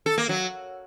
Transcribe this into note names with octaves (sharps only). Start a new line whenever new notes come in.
A4
A#3
F#3